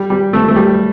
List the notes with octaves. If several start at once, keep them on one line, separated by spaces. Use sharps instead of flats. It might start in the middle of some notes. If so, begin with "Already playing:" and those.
Already playing: G3
G3
A3
A3
G3